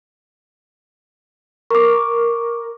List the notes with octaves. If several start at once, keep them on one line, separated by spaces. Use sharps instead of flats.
A#4 C#6 D6